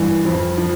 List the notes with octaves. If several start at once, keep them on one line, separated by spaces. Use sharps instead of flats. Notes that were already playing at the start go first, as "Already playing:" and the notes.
Already playing: G2 E3
F2
F3